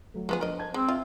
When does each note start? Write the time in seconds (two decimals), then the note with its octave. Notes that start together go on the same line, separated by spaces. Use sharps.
0.14 F#3 A3
0.29 F3 G#3 B3 G#4
0.41 D4 A#4 C5 D#5
0.59 A5 G#6
0.74 G#3 C4
0.88 F4 E5